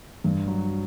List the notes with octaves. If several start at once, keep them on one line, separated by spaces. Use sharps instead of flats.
G2
F#3